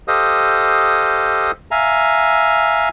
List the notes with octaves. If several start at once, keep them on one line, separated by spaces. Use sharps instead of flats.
G4 A4 C5 D#5 F5 D#6
E5 F5 G#5 A#5